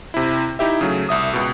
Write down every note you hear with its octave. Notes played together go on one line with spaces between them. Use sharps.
C3 E4
D#4 E4 G4 E5
C#3 F#3 A3
C2 E5 D#6
C#2 B2